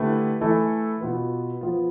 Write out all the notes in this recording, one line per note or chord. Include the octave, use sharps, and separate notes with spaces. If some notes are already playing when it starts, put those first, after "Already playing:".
Already playing: D3 A3 E4 G4 B4
E3 A3 E4 A4
B2 B3 F4 B4
F3 B3 F4